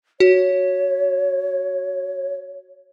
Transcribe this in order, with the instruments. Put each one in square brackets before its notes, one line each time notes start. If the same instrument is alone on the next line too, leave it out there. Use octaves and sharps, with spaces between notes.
[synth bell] F#4 [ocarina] C#5